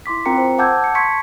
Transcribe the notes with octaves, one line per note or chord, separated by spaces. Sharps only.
E4 C6 D6 B6
C4 F4 A#4 G5 A#5 C#7
C5
F#5 A5 D6 E6 G6 G#6
A5 C#7
C6 C#6 G#6 B6 C#7